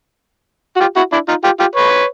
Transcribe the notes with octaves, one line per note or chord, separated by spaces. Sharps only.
F#4
F4 G4
E4 F#4
D4 E4
D#4 F4
F4 G4
F4 G4
B4 C#5